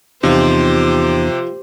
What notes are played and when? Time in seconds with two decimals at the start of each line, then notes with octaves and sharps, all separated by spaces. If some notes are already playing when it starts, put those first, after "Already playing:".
0.23 E2 C3 F3 B3 D#4 G4 C5